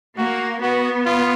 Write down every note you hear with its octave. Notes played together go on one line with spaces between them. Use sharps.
A#3 F#4
B3 F#4
F4